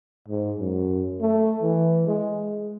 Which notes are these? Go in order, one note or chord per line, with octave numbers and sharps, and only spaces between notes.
G#2
F#2
A3
E3
G#3